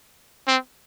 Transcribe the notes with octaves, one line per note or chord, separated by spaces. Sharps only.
C4